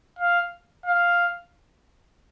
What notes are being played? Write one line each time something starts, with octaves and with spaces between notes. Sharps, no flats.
F5
F5